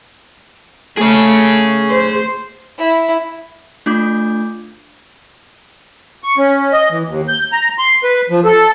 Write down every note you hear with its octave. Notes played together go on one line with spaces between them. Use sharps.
A3 G#4 C#5
C5
E4
A3 D4 F4 D6 G6
C#6
C#4
D#5
E3
D#2
G6
A#5
C6
B4
F3
A4